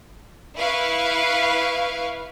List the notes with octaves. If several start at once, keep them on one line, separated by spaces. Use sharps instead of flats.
E4 B4 F5 C#6